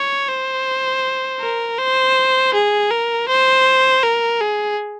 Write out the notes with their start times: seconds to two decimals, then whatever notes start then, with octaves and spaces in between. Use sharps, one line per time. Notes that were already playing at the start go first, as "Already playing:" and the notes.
Already playing: C#5
0.28 C5
1.40 A#4
1.78 C5
2.54 G#4
2.91 A#4
3.29 C5
4.03 A#4
4.41 G#4